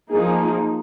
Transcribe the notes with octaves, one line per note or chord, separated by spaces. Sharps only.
F3 A#3 D#4 G#4